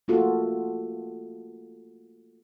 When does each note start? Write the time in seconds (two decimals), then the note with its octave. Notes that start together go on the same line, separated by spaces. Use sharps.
0.08 A3 A#3 F4 F#4 A4